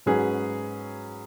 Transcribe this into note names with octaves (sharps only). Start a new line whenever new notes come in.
G#2 F#3 C#4 G#4 B4